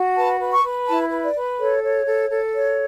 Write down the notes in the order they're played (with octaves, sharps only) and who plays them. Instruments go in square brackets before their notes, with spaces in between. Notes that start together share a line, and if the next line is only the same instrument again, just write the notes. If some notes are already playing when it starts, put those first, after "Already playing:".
Already playing: [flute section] F#4
B4 A5
B4
C#6
B4
E4 A5
B4
D5
B4
A4 C#5
C#5
A4
A4
C#5